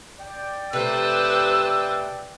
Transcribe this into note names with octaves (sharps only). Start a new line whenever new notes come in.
D5 G5
C3 A3 B4 C5 E6